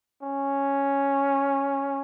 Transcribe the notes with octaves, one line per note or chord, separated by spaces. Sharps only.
C#4